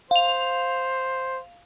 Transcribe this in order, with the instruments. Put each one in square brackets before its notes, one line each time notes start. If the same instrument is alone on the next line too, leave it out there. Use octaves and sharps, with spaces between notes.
[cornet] C5 [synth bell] F5 F7